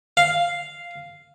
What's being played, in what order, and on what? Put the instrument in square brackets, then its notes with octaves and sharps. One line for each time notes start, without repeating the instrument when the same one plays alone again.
[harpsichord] F5